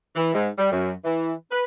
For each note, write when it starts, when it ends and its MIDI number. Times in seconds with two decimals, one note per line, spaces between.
0.16 0.32 52
0.34 0.49 44
0.58 0.69 55
0.71 0.92 42
1.04 1.32 52
1.51 1.64 71